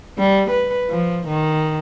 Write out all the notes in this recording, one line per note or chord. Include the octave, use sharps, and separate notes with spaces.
G3
B4
F3
D#3